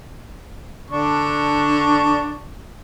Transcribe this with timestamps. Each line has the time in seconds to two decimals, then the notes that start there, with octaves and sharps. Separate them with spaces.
0.90 D3 D4 C#6